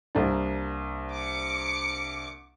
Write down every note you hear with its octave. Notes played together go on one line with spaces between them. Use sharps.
C2 A#3 D4
D6 C#7